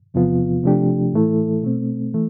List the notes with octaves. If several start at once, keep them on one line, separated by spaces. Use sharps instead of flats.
E2 C3 F3 B3 F4
C3 F3 A3 D4 G4
A2 E3 A3 E4 A4
B2 A3 C4
E3 A3